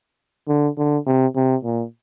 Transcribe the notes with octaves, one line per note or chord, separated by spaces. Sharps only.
D3
D3
C3
C3
A#2